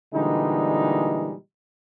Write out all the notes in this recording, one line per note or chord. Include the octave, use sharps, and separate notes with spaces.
A#2 D3 E3 G3 G#3 D#4